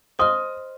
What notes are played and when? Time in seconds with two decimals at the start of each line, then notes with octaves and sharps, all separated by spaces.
0.19 C5 D#5 C6 D#6 F6